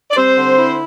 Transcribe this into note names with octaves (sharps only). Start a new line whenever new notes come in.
D5
G3 C4 C5
D3
E4